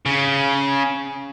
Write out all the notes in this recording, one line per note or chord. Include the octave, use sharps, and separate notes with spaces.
C#3